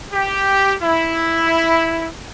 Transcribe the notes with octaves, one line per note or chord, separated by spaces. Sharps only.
G4
E4